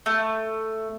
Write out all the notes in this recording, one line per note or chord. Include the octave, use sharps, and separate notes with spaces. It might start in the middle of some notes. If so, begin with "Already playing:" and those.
A3